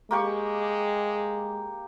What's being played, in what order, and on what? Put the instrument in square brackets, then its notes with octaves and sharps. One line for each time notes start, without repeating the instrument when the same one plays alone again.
[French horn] G#3 [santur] A#3 G4 C#6